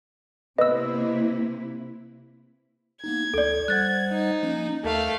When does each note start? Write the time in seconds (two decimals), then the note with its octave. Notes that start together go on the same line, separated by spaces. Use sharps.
0.58 C3 A#3 B3 E4 D#5 E6
3.04 A#3 B3 D#4 G#6
3.34 D2 A4 D5
3.68 G3 C5 F#5 F#6 A6
4.10 D#4
4.43 F3 A#3 C#4
4.84 D#2 A3 A#4 F5